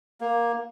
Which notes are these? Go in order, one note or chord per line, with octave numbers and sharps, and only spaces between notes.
A#3